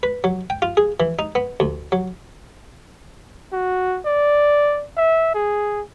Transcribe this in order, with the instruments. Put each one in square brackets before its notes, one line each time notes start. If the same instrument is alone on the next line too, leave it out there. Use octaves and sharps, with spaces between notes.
[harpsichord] B4
F#3
G5
F4
G#4
E3
D#4
B3
D2
F#3
[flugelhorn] F#4
D5
E5
G#4